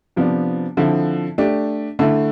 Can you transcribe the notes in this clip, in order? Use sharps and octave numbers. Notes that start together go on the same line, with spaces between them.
C3 F3 B3 D4
D3 F3 C4 E4
A3 D4 G4
D3 A3 E4